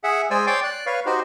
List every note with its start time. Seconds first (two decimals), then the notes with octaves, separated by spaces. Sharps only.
0.04 G#4 E5 F#5
0.31 G#3 C5 D5 G#5 E6
0.47 C#5 D5 G5 C6 D6
0.64 D5 F#6
0.86 B4 C#5 F5
1.06 D#4 F#4 G4 C5